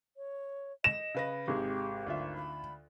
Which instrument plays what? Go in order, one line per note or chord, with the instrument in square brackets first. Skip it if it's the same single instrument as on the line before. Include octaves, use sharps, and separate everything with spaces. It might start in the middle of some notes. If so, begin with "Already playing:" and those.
[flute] C#5
[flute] D#5 [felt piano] A#6 [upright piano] E7
[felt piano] C#3 B4 A#6
[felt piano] G#1 [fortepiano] C3 G#3 [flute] G4
[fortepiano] D2 F4 E5
[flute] B5